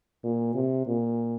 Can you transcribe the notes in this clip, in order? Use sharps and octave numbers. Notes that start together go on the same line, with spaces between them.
A#2
C3
A#2